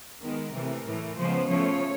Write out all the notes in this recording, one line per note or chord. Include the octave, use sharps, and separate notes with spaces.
D#3 G#3 B3 A#4
C3 E3 A3
A2 E3 A3
C#3 F3 G#3 B3 C5
C#3 F3 A3 C#5